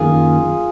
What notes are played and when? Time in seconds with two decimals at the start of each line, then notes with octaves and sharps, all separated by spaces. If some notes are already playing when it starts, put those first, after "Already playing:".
Already playing: F#2 D#3 A#3 F4 G#4